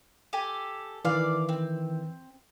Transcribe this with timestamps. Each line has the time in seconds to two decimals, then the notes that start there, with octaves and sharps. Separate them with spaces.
0.33 G4 A4 G#5
1.05 D#3 E3 D5 F5
1.49 C4